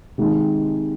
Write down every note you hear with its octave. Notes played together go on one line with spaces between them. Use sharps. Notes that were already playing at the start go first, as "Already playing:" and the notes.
C3 D#3 G#3 D#4